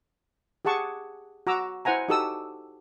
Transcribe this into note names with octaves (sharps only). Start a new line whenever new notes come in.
G4 G#4 F#5 A5 C#6
F#4 A#5 D6 E6
E4 C5 F#5 G#5 A#5
D#4 F#4 G4 A4 D#6 E6